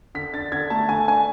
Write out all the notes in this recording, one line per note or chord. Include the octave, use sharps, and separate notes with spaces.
D3 B6
D4 A6
D3 G#6
A3 A5
D3 G#5
D4 G#5